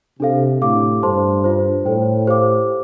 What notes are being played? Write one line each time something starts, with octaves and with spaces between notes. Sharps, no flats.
C3 D4 A4 F5
A2 D4 G4 F5 D6
G2 A4 C5 A5 C6
D4 F4 C5
A2 A4 C5 G5
G4 C5 F5 D6